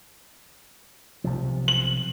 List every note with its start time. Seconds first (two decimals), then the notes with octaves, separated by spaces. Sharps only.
1.24 B1 C3 F3
1.68 F#7